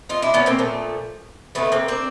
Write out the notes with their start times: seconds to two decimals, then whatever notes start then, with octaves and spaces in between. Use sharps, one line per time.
0.09 D#4 F4
0.22 D4 E4
0.34 B3 C#4
0.46 A#3 C4
0.58 A#2 F3 A3
1.55 C#3 E3 G#3 A3 B3
1.72 A#3 C4
1.88 C4 D4